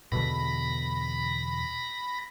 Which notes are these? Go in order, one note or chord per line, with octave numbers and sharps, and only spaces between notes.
E2 B2 D3 B5 A#6